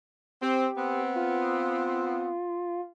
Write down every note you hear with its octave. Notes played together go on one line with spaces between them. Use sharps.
C4 G4
B3 C4
F4